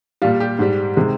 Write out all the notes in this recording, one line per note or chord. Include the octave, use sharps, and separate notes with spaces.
A#2 G3 F4
G4
G#2 G3
C3 D#3 G#3